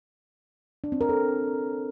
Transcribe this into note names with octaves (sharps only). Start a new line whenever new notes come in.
D4
C4
A#4
A4